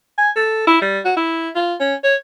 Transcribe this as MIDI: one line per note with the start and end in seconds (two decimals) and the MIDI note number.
0.18 0.30 80
0.36 0.63 69
0.67 0.80 64
0.82 0.99 55
1.05 1.12 66
1.17 1.50 64
1.55 1.74 65
1.80 1.95 61
2.04 2.15 73